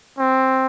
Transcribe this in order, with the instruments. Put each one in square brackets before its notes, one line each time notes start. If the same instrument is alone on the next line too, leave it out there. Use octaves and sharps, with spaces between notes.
[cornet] C4